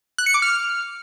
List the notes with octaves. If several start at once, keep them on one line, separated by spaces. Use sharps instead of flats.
F#6
C#7
D6
F6